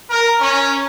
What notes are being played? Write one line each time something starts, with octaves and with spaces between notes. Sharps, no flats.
A#4
C#4